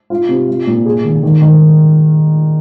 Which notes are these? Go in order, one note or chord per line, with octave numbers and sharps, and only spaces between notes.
F4
C3
F4
A#2
G#4
D#3
D#3
D#3